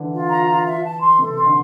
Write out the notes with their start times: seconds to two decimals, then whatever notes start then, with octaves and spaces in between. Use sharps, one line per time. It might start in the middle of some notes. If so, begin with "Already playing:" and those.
Already playing: D3 E3
0.12 F4
0.29 A#5
0.47 F4
0.65 E5
0.83 A5
1.01 C6
1.19 C3 A4
1.37 C6
1.46 D3